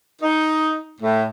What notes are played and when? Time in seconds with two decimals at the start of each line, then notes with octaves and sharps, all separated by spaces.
0.21 D#4
1.01 A2